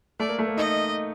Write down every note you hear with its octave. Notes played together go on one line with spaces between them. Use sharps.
A3 D5
A#3
A3
A#3
D#4 D#5